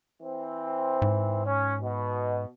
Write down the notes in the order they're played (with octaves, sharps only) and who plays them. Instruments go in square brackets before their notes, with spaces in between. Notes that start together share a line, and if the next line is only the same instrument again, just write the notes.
[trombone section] E3 C4
[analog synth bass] G#2
[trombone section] C#4
B2